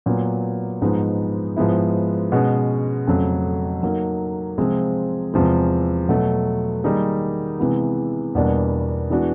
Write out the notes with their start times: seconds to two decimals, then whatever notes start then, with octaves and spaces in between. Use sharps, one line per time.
0.06 A#2 F#3 B3
0.82 G#2 F3 G#3 B3 D#4
1.57 G#2 F3 G#3 B3 E4
2.32 B2 G#3 C#4
3.07 F2 C#3 F#3 A3
3.83 F#3 A#3 D#4
4.58 C3 F3 G#3 C4 F4
5.34 E2 C3 F3 G#3
6.09 B2 F#3 A3
6.84 D#3 G3 A#3 D#4 G#4
7.60 C3 E3 G#3 B3
8.35 E2 B2 G3 A#3 D4
9.10 E3 G#3 B3 D4 F#4